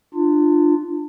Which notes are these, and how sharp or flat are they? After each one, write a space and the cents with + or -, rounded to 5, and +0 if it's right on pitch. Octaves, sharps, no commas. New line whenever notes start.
D4 +30 F4 -5